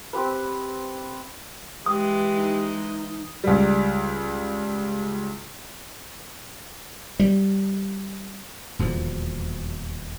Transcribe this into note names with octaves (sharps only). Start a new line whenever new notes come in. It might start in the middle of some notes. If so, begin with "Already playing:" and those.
C4 G4 B4
E3 G#3 G4 D#6
D#4
C#2 G3
G3
D#1 E2 B2 F3